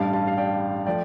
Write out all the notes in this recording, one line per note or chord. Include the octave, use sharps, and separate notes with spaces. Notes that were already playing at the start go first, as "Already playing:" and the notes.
Already playing: A1 G2 G3 F5 A5
F5 A5
F5
D5 G5
F3 A3 D5 G5